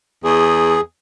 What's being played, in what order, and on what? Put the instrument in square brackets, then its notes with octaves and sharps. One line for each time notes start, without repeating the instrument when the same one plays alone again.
[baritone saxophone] E2 [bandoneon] G#4